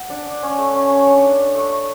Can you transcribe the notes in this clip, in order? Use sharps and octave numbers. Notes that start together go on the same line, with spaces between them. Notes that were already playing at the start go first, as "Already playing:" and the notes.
Already playing: F#5
D4 D5
D4
C#4
A3
C#4
C#4
D4 C#5
D4
D4
A3
A3